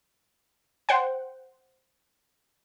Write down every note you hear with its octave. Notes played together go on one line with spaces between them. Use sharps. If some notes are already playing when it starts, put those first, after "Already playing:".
C5 F#5 G5